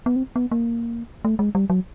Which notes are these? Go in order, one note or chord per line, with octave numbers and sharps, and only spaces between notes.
B3
C4
B3
A#3
A3
G#3
G3
F#3